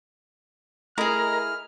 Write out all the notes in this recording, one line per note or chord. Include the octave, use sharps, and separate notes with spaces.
A3 E4 G#4 A#4 D#5 A#5 F6